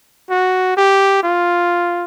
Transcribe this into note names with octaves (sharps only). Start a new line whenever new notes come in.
F#4
G4
F4